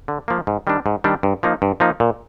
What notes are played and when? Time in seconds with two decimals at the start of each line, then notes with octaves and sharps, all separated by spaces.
0.08 D3
0.28 F3 A#3
0.47 G#2
0.67 D#3 G3 D4
0.86 G#2
1.04 D#3 G3 D4
1.23 G2
1.43 F3 A#3 D#4
1.62 G2
1.80 F3 A#3 D#4
2.00 A#2